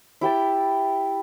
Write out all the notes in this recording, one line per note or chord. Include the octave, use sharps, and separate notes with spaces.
E4 G4 G5 A5